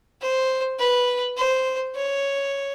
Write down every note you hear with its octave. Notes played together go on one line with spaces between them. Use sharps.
C5
B4
C5
C#5